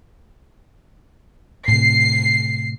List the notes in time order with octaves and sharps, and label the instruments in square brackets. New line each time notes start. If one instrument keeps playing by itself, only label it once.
[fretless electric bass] A2 C3 [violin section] C7